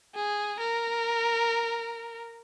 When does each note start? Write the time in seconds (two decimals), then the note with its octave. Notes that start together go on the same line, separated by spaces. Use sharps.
0.15 G#4
0.60 A#4